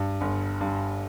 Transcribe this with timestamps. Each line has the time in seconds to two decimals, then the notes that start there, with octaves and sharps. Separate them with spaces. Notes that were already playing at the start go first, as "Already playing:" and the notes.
Already playing: G2
0.21 G1
0.61 G2